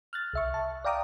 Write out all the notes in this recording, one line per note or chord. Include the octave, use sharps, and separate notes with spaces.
F6 F#6 A6
C2 E5 C#6
A5
D5 F5 G5 A#5 D6 D#6